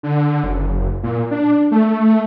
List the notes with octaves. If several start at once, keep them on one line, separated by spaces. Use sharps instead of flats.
D3
F#1
A#2
D4
A3